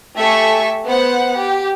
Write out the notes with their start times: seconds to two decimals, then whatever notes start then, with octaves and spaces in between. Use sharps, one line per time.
0.17 A3 G4 A4 E5 G#5 C#6
0.84 B3 C5 F#5
1.35 G4